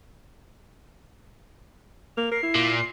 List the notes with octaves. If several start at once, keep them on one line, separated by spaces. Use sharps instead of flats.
A#3 F7
A#4 C7
E4
A#2